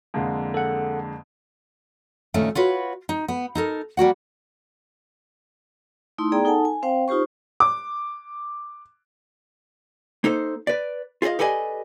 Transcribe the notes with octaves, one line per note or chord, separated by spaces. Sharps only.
F2 D3 G#3 A#3
A4 F#5
D2 A#2 D#3 A3 C#4
F4 F#4 B4 C#5
D#4
B3
D#4 A4 A#4
G3 A#3 F#4 F#5
A3 D#4 E4 C6
B3 G#4 D5 G5 A#5
D#4 A4 F#5 G#5 A5
G#5
C4 C5 F5 G5
D#4 F4 G4 C5 C#6
D6
A#3 D#4 A4 C5
B4 D5
F4 G#4 D5 D#5 F5
G4 A4 B4 D5 D#5 G#5